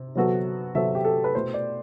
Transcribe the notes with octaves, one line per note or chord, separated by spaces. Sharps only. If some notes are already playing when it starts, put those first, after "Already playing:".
Already playing: C3
C3 F#3 B3 F#4 A4
C3 F#3 B3 F#4 A4 E5
G4
A4
B4
B2 A3 E4 C5
D5